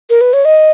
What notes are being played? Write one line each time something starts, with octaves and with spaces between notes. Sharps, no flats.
A#4
B4
C#5
D#5